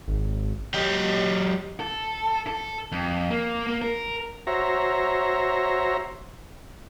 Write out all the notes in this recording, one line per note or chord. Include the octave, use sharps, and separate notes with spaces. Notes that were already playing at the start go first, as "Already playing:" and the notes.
G#1
F#3 G4 D#5 G5
A4
A4
F2
A#3
A#3
A#4
F#4 C5 C#5 E5 A#5